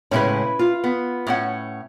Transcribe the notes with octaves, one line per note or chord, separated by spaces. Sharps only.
A2 C#3 G#3 C#4 E4 B4
F4
B3
A2 C#4 F#5